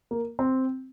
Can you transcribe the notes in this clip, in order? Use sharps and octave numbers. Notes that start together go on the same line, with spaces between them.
A#3
C4